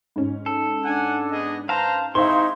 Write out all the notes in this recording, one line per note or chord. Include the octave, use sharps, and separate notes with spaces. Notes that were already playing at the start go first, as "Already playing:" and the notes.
G#2 C#4
A4
D4 F#5 G#5
B3 G#4 D#5
B4 C5 F5 A5 A#5
G#3 C4 D#4 E4 C5 F5 C6 C#6